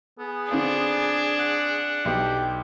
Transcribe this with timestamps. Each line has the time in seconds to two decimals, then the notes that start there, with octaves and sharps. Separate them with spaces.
0.19 B3 G#4
0.51 D3 C4 D4 F4
1.39 F#5
2.05 B1 G4